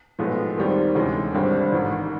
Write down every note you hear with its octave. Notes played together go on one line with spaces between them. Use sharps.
B1 A2 F3 G#3 B3
D#2 D#3 G3 C4
D2 C3 E3 G#3 C#4
G#1 G2 D3 G3 C4
A1 G#2 D#3